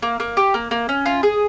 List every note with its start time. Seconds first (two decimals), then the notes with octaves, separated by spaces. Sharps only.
0.02 A#3
0.20 A#3
0.37 G4
0.54 A#3
0.71 A#3
0.89 C#4
1.06 F4
1.23 G#4